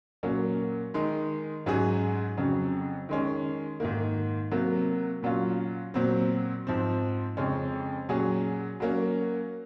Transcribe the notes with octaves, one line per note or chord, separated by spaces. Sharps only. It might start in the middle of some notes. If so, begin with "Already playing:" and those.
A#2 F#3 A#3 C#4
D#3 G#3 D#4
G#2 F#3 C#4 G#4
F2 C#3 F#3 C#4
D#3 G#3 C#4
G#2 D#3 A#3
C3 F#3 A#3
A#2 F#3 C#4 F4
A#2 F#3 C4
G#2 F3 C4
F2 C#3 G#3 C#4
A#2 F#3 C#4 G#4
F#3 A#3 C#4